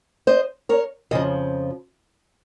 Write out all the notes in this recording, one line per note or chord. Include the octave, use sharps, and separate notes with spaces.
C5 D#5
A#4 C#5
F2 C#3 F3 D#5